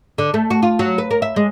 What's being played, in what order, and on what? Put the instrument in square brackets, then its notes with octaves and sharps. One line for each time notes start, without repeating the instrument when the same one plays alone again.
[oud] D3
A3
F#4
F4
F#3
B4
A#4
E5
G#3